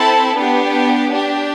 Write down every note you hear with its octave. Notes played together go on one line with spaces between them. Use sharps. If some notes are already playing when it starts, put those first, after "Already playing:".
Already playing: C4 E4 A4 A5 B5
B3 D4 G4
D4 G4